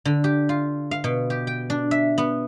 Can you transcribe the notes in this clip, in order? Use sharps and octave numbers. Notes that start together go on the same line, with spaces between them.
D3
G4
F4
F5
B2
G4
G5
D4
E5
B3